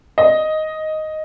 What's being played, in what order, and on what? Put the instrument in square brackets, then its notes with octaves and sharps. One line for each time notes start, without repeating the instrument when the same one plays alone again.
[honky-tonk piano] D#5